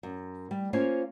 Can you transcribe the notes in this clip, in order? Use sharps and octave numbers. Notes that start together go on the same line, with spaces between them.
F#2
G3
A#3 C#4 F4 C5 C#5 G#5